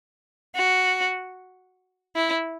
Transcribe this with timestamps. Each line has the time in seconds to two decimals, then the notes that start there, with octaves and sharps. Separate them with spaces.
0.56 F#4
2.16 E4